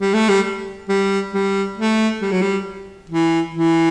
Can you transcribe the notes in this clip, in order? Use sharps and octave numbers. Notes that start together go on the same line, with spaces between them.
G3
A3
G3
G3
G3
A3
G3
F#3
G3
E3
E3